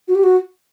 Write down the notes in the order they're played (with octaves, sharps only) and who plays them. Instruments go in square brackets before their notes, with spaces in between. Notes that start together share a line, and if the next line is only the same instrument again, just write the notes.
[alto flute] F#4
G4
F#4